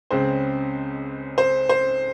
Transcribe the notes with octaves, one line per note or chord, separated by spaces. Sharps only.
C#2 C#3 G#3 C4 C5
C5
C5